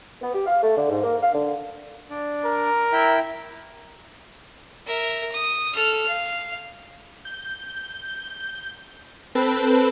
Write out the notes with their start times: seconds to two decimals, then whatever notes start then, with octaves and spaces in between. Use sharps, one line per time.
0.21 B3
0.33 G4
0.46 F5
0.62 A3
0.77 D3
0.89 G#2
1.03 A#3
1.22 F5
1.34 D3
2.10 D4 D5
2.45 A#4
2.93 E4 E5 G5
4.86 A#4 E5
5.31 D#6
5.75 A4 F6
6.08 F5
7.25 G6
9.35 C4 A4 B4